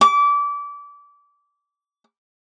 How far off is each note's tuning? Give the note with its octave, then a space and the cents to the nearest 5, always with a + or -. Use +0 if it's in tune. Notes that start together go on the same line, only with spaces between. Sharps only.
D6 -25